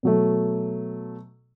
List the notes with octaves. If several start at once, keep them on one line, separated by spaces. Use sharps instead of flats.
B2 F#3 A3